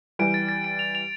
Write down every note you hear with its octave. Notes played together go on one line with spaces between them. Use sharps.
E3 G3 D7
A6
A6
D7
F7
F7